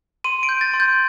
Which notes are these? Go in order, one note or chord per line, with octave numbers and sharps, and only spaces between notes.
C6 D#7
D7
G6
A6
C6
G6